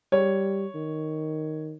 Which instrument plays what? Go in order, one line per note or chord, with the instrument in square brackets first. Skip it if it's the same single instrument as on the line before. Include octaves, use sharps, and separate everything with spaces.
[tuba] G3 [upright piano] C#5
[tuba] D#3